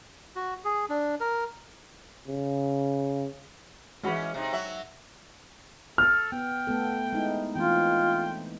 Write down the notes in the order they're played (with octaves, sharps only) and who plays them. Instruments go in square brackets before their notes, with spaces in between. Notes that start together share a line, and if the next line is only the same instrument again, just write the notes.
[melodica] F#4
G#4
D4
A#4
[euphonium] C#3
[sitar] E3 C#4 [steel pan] G#3 F#4 B5
[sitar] C3 D#4
F#3 F#4 E5
[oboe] A4 [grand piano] F6
[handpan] B3 [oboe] G5
[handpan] A3 B3 A4
G#3 D#4 E4
[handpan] E3 A3 C4 [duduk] F4 [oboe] G5